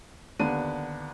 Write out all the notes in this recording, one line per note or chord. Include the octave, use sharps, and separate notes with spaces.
D#2 D3 B3 D4 D#7